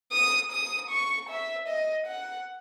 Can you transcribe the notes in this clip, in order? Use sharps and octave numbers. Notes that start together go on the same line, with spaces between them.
D#6
D#6
C#6
E5
D#5
F#5